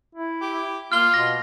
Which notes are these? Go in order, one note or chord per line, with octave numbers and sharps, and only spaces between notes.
E4
G4
A#3 F4 F6 G7
B2 A#6